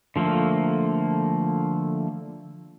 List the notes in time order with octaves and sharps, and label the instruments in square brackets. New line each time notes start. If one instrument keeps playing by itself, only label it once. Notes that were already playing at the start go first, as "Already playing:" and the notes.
[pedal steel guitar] D3 F3 A3 A#3